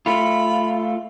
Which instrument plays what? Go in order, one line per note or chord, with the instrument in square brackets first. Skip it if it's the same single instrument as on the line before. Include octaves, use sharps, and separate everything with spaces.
[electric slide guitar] A3 F4 [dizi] B5